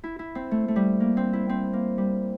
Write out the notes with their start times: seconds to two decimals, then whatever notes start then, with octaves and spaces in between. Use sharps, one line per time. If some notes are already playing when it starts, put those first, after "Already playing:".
0.04 E4
0.19 E4
0.35 C4
0.51 A3
0.68 A3
0.76 G3
1.00 A#3
1.17 C4
1.33 E4
1.49 C4
1.73 A#3
1.98 G3